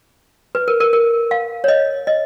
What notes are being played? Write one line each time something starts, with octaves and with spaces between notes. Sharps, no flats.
B4
A#4
A#4
A#4
F5
C#5
D#5
D#5